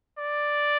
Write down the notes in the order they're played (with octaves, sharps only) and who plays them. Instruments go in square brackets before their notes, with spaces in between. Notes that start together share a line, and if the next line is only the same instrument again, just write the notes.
[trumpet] D5